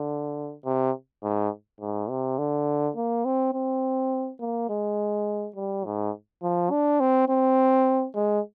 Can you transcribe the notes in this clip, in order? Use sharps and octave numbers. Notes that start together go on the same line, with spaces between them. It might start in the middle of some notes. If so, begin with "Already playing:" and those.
Already playing: D3
C3
G#2
G#2
C3
D3
A#3
C4
C4
A#3
G#3
G3
G#2
F3
D4
C4
C4
G#3